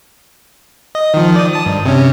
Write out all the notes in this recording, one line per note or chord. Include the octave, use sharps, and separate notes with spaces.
D#5
D#3 F3
D5 D#6
A5 D#6
G2
C3 C#4